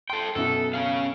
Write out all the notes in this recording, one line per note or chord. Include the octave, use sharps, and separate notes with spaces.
A4 G5 C6
F#2 B2 E4 A4
C#4 F5